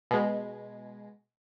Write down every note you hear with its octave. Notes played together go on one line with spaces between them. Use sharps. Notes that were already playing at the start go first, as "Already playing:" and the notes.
B2 G#3